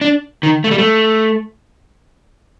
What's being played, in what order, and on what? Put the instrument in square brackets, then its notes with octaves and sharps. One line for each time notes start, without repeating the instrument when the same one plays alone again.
[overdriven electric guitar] D4
D#3
A3
G3
A3